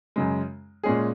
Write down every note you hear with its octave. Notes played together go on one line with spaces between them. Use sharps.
F#2 C#3 G#3
A#2 G#3 C#4 G#4